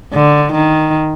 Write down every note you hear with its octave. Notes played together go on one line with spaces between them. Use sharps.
D3
D#3